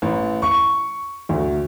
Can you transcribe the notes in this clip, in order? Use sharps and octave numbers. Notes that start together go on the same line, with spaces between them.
A1
C#6
D2